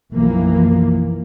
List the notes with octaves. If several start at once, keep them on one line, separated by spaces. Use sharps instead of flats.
B1 F#2 E3 F3 A#3